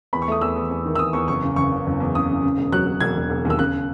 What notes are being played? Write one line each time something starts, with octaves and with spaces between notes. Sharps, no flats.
E2 B5
C#6
A3 D#6
E2 E6
E2
E2
D#3
E6
E2 D#6
E2 C#6
F#1 C#6
C#3
F#1 C#6
C#3
F#1
E2
C#3 D#6
C#3
C#3
E1
F#3 F#6
F#3
E1 G#6
E1
E1
D#2
E6
C#3 F#6